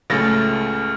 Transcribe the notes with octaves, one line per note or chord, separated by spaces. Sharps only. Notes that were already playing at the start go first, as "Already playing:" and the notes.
C#2 A2 C#3 A3 A6 A#6